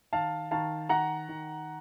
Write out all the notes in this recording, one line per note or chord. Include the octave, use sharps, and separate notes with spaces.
D#3 F5 A5
D#3 F5 A5
D#3 F#5 A#5
D#3